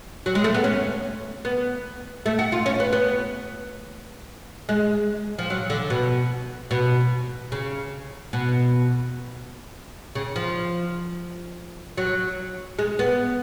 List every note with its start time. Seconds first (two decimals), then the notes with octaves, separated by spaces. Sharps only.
0.26 F#3
0.35 G#3
0.44 A3
0.54 B3
0.64 C#4
1.45 B3
2.26 A3
2.39 F#4
2.52 F4
2.66 C#4
2.80 B3
2.93 B3
4.69 G#3
5.39 F3
5.50 F#3
5.70 D3
5.90 B2
6.71 B2
7.52 C#3
8.33 B2
10.15 C#3
10.36 F3
11.97 F#3
12.79 G#3
12.99 B3